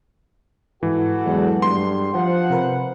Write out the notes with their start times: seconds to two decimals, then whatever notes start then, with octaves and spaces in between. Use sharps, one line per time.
0.83 G#2 E3 F#4 A4 F#5
1.26 E2 F#3 G#3
1.62 G2 C6
2.14 F3 C5 F#5
2.50 C3 A#4 B4